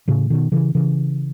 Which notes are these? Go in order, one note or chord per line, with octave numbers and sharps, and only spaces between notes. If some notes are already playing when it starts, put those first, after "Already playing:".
A2 C#3
B2 D#3
C#3 E3
C#3 E3